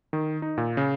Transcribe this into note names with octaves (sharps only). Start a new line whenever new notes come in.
D#3
D#4
A#2
C#3